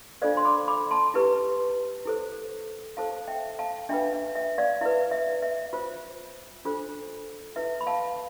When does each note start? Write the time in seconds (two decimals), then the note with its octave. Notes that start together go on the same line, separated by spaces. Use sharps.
0.22 D4 F4 A4 C5 D5 F5
0.37 C6
0.45 B5 D6
0.68 B5 D6
0.91 A5 C6
1.14 E4 G4 B4
2.05 E4 A4 C5
2.97 E4 A4 C5 F5 A5
3.28 E5 G5
3.59 F5 A5
3.89 D4 F4 B4 E5 G5
4.13 E5
4.35 E5
4.58 D5 F5
4.81 E4 B4 E5
5.11 E5
5.42 E5
5.73 F4 C5
6.65 D4 F4 A4 C5
7.56 E4 B4 E5
7.81 B5
7.87 F5 A5